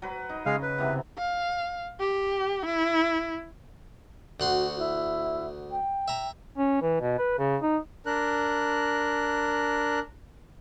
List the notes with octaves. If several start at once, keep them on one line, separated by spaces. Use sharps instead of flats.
F#3 B4
D#4
C#3 G#3 F5
B4
C3 E3 B3
F5
G4
E4
D2 F#4 F#5 C6
E4
G5
E5 A#5
C#4
E3
B2
B4
C#3
D#4
D4 A#4 F#6